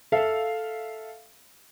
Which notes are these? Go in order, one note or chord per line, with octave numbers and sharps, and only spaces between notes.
A4 E5 F5